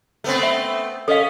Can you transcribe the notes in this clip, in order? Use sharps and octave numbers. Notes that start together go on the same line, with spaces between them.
A3 B3 C4
E5
C#4 A4 D#5 F5